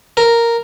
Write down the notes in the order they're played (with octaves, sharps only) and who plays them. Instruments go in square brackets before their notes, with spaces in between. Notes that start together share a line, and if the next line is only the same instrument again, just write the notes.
[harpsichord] A#4